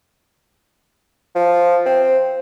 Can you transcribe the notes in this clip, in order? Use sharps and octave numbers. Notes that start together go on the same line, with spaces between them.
F3
C4